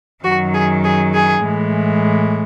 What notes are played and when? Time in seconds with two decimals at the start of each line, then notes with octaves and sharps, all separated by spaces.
0.24 F#2 D#3 F#3 F#4
0.53 G#4
0.84 G#4
1.14 G#4
1.44 A2 E3 G#3